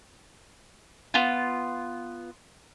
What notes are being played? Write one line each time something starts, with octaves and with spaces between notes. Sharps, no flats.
B3 F4